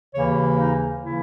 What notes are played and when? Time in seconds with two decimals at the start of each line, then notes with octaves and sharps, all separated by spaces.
0.13 D#2 C#3 E3 A#3 C#5
0.58 D#4
1.02 C#3 E3 A#3 E4